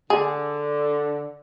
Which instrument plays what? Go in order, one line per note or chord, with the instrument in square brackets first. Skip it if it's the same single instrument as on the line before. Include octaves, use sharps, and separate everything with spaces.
[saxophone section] D3 [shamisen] G#4